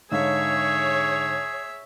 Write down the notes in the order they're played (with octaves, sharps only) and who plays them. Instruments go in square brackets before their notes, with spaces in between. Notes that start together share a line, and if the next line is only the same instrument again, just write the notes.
[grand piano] G#2 D3 F5 [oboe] G#4 [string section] C#5 [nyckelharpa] E5